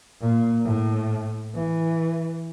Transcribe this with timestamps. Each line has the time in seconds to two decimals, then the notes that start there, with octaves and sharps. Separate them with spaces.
0.20 A#2
0.65 A2
1.55 E3